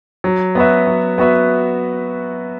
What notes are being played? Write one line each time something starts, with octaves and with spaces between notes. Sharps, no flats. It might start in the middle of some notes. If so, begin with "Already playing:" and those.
F#3
B3 F#4 B4 E5
F#3
B3 F#4 B4 E5